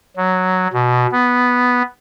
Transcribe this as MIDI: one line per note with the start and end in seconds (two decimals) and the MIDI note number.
0.17 0.67 54
0.73 1.07 47
1.12 1.82 59